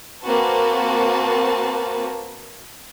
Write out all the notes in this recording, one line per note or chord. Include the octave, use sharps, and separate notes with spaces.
A#3 C4 F#4 B4 A5